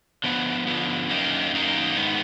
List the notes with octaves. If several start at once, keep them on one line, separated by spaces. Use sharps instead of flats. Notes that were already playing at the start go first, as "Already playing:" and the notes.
D3 F3 B3
D3 F3 B3
F#2 D#3 A#3 D#4
F#2 D#3 A#3 D#4
G#2 D#3 G#3 B3